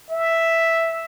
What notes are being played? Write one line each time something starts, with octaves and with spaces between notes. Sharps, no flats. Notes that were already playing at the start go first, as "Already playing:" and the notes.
E5